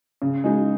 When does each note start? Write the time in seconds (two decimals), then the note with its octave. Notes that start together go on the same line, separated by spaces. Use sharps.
0.22 C#3
0.44 G#3 D#4